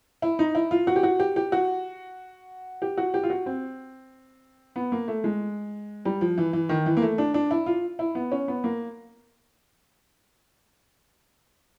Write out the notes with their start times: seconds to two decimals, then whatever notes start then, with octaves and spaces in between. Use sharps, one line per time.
0.22 E4
0.39 D#4
0.55 E4
0.71 F4
0.87 F#4
0.96 G4
1.03 F#4
1.19 G4
1.36 G4
1.52 F#4
2.82 G4
2.97 F#4
3.14 G4
3.23 F4
3.30 F#4
3.46 C4
4.76 B3
4.92 A#3
5.08 A3
5.24 G#3
6.05 G3
6.21 F3
6.38 E3
6.53 E3
6.69 D#3
6.86 E3
6.97 A#3
7.02 A3
7.18 D4
7.34 D4
7.51 E4
7.66 F4
7.99 E4
8.15 B3
8.32 C#4
8.48 B3
8.64 A#3